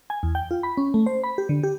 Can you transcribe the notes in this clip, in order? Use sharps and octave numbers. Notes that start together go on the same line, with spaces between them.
G#5
E2
G5
F4
B5
C#4
A3
C5
B5
G4
D3
G4